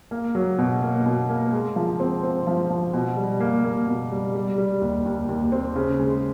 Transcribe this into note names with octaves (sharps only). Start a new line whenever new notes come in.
A#3
F#3
B2
A#3
B2
A#3
G#3
F3
C4
C4
F3
F3
B2
G3
A#3
A#3
B2
G3
G3
G3
D#2
D#2
D#2
C4
C#3
G#3